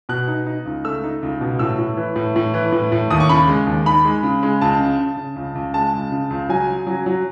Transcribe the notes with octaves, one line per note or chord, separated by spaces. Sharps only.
B2 F#6
D#4
D#4
C#2
A3 E6
D#4
C#2
B2
A2 E6
A2
E3
A2
A2
E3
A2
A2
D#2 D#6
C#6
C#3 B5
G#3
D#2
D#4 B5
G#3
C#3
G#3
C#2 A5
C#3
C#3
C#3
C#2
C#2
G#3 A5
C#2
C#3
C#2
F#3 G#5
C#3
F#3
F#3